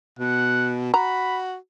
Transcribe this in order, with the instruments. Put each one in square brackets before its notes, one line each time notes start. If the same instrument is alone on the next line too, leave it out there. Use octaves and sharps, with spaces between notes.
[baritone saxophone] B2 [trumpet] F#5
[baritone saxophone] F#4 [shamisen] A#5 [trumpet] B5